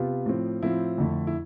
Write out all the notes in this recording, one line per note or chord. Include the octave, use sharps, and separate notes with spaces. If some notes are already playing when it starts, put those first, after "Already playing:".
Already playing: C3 B3 F4
A2 F3 C4
A2 F3 C4 E4
F2 D3 A3
E4